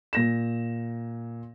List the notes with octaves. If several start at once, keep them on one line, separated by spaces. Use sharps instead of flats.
A#2 A#6 E7